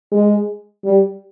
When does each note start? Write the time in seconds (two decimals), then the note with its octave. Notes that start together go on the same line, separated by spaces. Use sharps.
0.12 G#3
0.85 G3